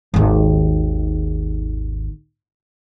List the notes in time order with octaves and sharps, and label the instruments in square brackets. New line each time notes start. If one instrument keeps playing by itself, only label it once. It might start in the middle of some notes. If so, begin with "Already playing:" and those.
[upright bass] G#1 D#2